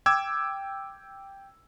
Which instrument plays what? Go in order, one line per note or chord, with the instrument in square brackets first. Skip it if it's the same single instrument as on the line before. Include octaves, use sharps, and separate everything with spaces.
[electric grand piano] G5 D6 E6 G#6